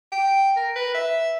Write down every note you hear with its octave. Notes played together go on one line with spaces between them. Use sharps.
G5
A#4
B4
E5